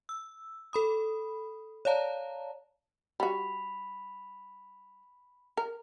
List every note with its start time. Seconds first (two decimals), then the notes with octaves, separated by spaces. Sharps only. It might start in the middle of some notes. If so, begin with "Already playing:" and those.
0.09 E6
0.73 A4 B5 D#6
1.85 C#5 D5 F5 A5 A#5
3.20 G3 F#4 B5
5.57 A#4